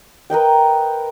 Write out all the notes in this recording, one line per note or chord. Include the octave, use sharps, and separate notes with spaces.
A#4 B4 D#5 G5